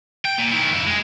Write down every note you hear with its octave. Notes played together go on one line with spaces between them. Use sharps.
G5
A#2
D#3 E4
F2 E4
G#3 G#4